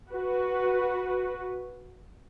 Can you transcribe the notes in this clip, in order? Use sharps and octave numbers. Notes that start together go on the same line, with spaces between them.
F#4 B4